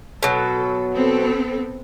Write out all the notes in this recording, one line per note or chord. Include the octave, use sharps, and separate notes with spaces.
B2 F#3 A4
B3 C4 A4